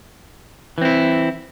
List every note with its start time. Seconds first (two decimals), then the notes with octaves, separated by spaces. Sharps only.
0.78 E3
0.81 C4
0.85 E4